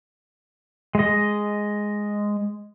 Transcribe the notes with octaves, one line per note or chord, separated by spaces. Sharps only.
G#3 D#5